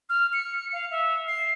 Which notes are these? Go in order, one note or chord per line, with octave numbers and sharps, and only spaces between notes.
F6
C#7
F5
E5
C7